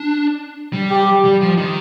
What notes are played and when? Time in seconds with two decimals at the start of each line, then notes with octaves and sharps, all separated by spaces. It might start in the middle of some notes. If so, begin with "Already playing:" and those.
Already playing: D4
0.73 G3
0.90 G4
1.25 G3
1.41 F3
1.57 D#3